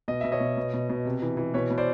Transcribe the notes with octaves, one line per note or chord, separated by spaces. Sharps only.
B2 D#5
B2 E5
C#5 D#5
B2
B2
B2
B2
C3
E3
E3
B2 B4 C#5
B2
C5 D5